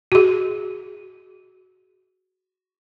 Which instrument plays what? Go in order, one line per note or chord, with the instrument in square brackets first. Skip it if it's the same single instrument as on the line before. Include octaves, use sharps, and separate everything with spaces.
[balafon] F#4 G#4